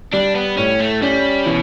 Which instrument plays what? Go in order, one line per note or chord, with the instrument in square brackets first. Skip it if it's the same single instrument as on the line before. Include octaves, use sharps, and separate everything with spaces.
[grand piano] G3 [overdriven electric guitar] D4
[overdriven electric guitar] B3
[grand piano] A2 [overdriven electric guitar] C#4
[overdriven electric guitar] A3
[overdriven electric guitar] G3 [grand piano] C#4
[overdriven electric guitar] B2 [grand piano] E3